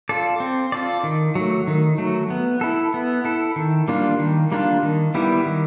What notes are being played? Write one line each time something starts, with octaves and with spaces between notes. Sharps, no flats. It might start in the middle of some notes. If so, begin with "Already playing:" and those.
F4 A4 D5
C4
F4 A4 D5
D#3
F#3 A3
D#3
F#3 A3
B3
E4 A4
B3
E4 A4
D#3
G3 A#3 D4 F4
D#3
G3 A#3 D4 F4
D#3
G3 B3 E4 G4
D#3